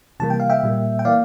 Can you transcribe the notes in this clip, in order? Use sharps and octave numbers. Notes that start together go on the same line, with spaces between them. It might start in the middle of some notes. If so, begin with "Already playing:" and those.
C3 E3 G3 A#3 A5
G5
F5
E5 G5
A#2 G3 A#3
G5
E3 A#3 D5 F5